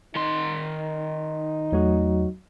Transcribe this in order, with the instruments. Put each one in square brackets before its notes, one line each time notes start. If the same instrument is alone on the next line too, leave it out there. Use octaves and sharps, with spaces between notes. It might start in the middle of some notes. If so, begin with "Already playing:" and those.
[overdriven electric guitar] D#3 C6 [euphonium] D#4
[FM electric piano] E2 A3 [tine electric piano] F#3 F#4